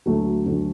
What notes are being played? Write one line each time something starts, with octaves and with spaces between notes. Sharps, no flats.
D2 D3 F#3 A3
D2 D3 F#3